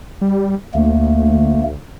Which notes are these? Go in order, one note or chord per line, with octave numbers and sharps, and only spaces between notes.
G3
D2 A3 A#3